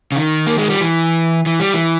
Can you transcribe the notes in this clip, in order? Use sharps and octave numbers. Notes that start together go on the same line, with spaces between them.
C#3
D#3
A#3
G#3
G3
E3
E3
G3
E3